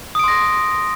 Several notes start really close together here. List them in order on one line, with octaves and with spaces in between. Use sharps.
D#6 D7 C6 A#6